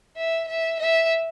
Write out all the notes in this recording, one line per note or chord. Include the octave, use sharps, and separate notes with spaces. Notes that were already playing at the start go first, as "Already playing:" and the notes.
E5
E5
E5